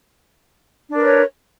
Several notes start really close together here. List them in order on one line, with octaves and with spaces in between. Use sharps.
D4 A#4 B4 C#5